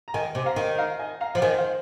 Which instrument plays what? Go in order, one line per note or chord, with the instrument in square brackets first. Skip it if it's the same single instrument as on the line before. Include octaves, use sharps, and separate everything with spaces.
[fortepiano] A#5
[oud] D#3 [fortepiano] D#5 G#5
[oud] C3
[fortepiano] F5 A#5
[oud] D#3
[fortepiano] F5 A#5
D#5 G#5
F5 A#5
[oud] F3 [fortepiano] F5
[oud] D#3 [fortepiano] D#5 G#5
[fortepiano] C5 F5